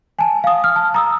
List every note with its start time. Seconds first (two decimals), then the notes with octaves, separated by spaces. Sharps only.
0.19 G#5 A5
0.44 F5 D#6
0.64 F6
0.76 A5
0.94 A#5 D#6 E6